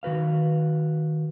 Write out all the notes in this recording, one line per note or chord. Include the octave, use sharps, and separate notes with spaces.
D#3 F#4 B4 F5